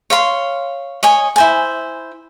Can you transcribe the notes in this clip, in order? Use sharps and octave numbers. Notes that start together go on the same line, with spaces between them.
C#5 F5 C6
C#5 D#5 G#5
E4 C5 G#5